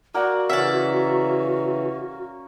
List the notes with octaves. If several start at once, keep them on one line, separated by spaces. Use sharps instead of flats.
A#3 F#4 D5 F#5
C#3 E3 C#4 D5 E5 F#5 E6